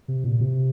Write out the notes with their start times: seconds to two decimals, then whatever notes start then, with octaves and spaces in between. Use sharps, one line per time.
0.08 C3
0.24 A#2
0.41 C3